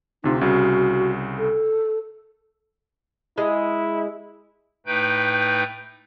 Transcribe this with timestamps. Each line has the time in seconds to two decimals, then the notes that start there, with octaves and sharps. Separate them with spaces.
0.24 D2 C3 D#4 F4
0.41 C2 C#3 F#4
1.39 A4
3.38 G#3 E4
4.86 A2 A3 D#4 B4 G5 G6